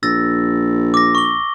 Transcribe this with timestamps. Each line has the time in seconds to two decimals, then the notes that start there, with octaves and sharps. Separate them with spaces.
0.03 A#1 E6 A6 A#6
0.94 D6 A#6
1.15 C#6 G7